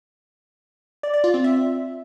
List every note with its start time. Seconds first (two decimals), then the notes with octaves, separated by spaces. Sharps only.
1.03 D5
1.14 D5
1.24 F4
1.34 C4
1.44 E5